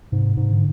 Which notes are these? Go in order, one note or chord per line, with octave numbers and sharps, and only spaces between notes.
G#2 C3
G#2
D3